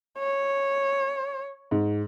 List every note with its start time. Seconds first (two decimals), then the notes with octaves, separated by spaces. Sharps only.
0.19 C#5
1.71 G#2